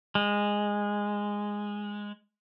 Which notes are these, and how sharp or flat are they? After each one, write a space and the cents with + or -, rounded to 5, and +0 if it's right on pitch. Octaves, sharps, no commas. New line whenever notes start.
G#3 -10